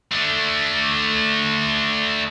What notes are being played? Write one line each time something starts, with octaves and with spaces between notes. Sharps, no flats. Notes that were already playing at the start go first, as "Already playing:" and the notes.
A3 D4